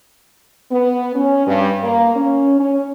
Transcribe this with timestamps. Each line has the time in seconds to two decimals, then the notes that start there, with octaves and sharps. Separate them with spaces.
0.71 B3
1.15 C#4
1.46 G2
1.83 A#3
2.15 C#4
2.60 C#4